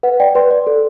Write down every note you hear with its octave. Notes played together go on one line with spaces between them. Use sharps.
B4 F#5
D5 G5
B4 C6
D5
A4